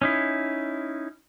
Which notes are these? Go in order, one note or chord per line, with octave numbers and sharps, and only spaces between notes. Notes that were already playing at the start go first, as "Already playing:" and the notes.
C#4 D#4 E4